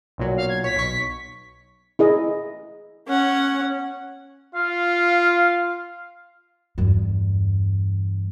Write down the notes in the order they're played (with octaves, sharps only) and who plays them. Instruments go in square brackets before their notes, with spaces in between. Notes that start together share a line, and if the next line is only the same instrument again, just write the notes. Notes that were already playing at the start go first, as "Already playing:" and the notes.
[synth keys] B1 A#2 F#3
[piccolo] F5
G#6
[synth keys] C#5 [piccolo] B6
[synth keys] B1 C#6
[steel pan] E4 G#4 D#5
[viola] C#4 F#5
[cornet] F4 [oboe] F5
[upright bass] E2 G2